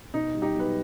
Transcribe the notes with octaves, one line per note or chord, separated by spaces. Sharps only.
B2 D#4
G3
D#4 G4
B1 B4